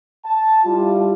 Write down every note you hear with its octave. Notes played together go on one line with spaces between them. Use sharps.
A5
G3 E4 F4